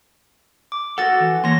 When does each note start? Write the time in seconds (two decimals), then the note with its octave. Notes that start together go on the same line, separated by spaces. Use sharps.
0.72 D6
0.98 F#4 A4 F#5 A6
1.20 E3
1.44 A#3 C#5 C6 A#6